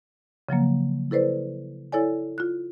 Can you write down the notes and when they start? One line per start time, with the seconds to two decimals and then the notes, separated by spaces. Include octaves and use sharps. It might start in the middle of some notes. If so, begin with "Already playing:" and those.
0.49 C#3 F3 F#3 A#3
1.11 E4 A4 B4 C5 D5
1.92 E4 A4 C#5 D5 G#5
2.38 F4 F#6